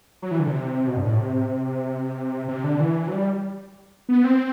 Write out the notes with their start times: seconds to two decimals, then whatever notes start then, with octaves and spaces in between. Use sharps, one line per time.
0.22 F#3
0.31 E3
0.39 D3
0.47 C3
0.87 B2
0.97 G2
1.04 A2
1.19 C3
2.48 C3
2.64 D3
2.80 E3
3.08 F#3
3.12 G3
4.09 B3
4.24 C4